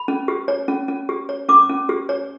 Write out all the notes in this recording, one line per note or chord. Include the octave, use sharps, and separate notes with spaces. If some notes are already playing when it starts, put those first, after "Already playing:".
Already playing: B5
C#4
G4
C#5
C#4
C#4
G4
C#5
C#4 D6
C#4
G4
C#5